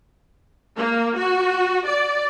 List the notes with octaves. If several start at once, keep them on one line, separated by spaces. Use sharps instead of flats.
A#3
F#4
D5